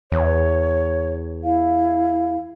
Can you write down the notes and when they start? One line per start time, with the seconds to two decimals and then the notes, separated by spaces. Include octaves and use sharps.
0.12 E2 C#5
1.44 E4 F5